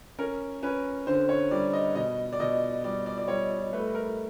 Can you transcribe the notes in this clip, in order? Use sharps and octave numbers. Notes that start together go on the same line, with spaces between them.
C#4 A#4
C#4 B4
D3 C5
C#5
G3 D5
D#5
B2 D#5
D5
B2 D#5
G3 D5
D5
D5
G3 C#5
A3 B4
A#4